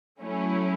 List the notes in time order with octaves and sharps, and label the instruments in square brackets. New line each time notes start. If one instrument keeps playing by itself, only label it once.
[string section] F#3 A3 C#4 E4